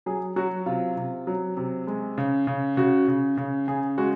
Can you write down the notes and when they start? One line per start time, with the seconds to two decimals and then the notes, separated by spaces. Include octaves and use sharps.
0.06 F#3 G#4
0.36 F#3 F#4
0.66 C3 F4
0.97 C3
1.27 F#3
1.57 C3
1.87 G#3
2.18 C#3
2.47 C#3
2.77 C#3 F#4
3.08 C#3
3.37 C#3
3.68 C#3 G#4
3.98 G#3 F#4